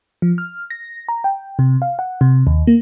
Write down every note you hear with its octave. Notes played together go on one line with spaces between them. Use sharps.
F3
F6
A#6
A#5
G5
C3
F5
F#5
C3
D#2
A#3